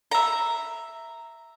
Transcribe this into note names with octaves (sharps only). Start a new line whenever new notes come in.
E5 A#5